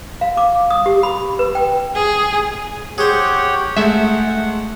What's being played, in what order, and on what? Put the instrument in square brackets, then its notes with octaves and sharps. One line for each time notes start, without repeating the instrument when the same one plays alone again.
[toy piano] F5
D6
D#6
G4
B5
B4
G5
[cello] G#4
[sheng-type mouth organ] G4 C#5 F#5 [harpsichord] G#4 C5
[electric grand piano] G#3 A3 [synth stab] E5 [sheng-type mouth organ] F#5